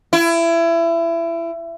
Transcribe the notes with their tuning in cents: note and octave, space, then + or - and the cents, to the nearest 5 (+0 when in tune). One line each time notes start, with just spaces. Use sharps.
E4 +25